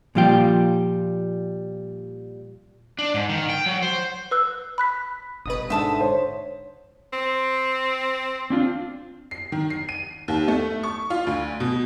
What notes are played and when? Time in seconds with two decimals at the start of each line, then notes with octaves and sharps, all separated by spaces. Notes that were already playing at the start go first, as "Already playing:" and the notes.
0.15 A#2 F3 G3 F4 G5
2.99 D4
3.14 G#2
3.29 D#3
3.49 G5
3.66 F#3
3.82 C5
4.31 B4 E6 F#6
4.78 B5 F#6 B6
5.46 G1 B2 B4 D#6
5.70 G#2 D3 E5 A5 D#6
6.01 C5 C#5
7.13 C4
8.50 C4 D4 F4
9.31 C7
9.52 D#3
9.70 C7
9.89 D#7
10.28 D#2
10.48 A3
10.83 C#6
11.10 F4
11.27 D2
11.60 B2